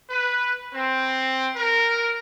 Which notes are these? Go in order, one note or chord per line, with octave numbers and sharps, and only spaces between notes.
B4
C4
A#4